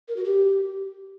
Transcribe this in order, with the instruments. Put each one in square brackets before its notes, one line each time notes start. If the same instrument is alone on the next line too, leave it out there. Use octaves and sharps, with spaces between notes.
[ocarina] A#4
F#4
G4